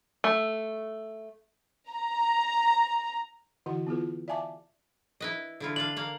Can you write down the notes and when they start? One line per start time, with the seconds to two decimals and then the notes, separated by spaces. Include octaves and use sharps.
0.24 A3
1.90 A#5
3.66 D3 E3 E4 F#4 D#5 F#5
3.87 B3 E4 F4 G#4 B4
4.28 D5 E5 F5 G#5 A5 D6
5.20 E4 B4 D#5
5.60 D3 E4 F4
5.76 D4 F4 F5 F#7
5.97 A#3 F5